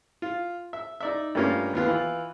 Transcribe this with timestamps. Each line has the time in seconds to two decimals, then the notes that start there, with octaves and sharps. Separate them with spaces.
0.22 F4
0.73 E5
1.01 D#4 D5 E5
1.35 G2 A3 A#3 C#4 F4
1.73 D#2 B3 F4
1.88 E3 F4